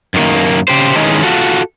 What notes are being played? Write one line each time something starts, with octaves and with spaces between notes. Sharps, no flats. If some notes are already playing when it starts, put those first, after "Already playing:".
F#2 D#3 A#3
C#3 G4 C5
D#3 E3 G#3 C#4 D#4
F4 F#4 A4